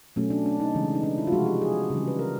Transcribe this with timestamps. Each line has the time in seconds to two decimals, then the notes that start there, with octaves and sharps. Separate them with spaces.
0.16 B2 F#3 A3 C#4
0.30 D4
0.46 D4
0.60 D#4
0.75 C#3 E3 G#3
0.94 D#4
1.03 D4
1.18 E4
1.27 F4
1.32 C3 F3 G#3 F#4
1.46 G4
1.62 G#4
1.90 C#3 E3 G3
2.08 B4
2.19 A#4